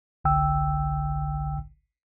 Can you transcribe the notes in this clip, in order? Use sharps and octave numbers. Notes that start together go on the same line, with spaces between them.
G1 C2 D3 G5 E6